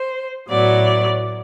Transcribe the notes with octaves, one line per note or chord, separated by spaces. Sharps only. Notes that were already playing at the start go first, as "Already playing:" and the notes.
Already playing: C5
A2 F#3 B3 D5